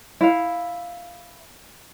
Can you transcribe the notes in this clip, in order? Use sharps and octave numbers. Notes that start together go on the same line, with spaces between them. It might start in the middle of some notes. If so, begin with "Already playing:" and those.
E4 F5